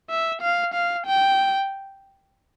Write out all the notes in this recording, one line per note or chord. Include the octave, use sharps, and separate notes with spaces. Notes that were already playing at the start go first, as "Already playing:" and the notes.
E5
F5
F5
G5